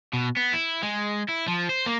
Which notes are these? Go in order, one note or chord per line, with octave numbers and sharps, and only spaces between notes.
B2
B3
E4
G#3
E4
F3
C5
A#3